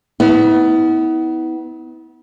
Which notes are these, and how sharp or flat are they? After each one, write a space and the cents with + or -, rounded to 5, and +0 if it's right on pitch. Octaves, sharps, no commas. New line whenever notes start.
B3 +20 E4 -35